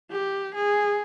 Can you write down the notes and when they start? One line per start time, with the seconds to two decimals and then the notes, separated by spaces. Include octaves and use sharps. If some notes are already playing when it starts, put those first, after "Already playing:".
0.11 G4
0.55 G#4